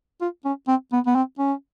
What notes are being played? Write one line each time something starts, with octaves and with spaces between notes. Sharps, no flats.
F4
C#4
C4
B3
B3
C4
C#4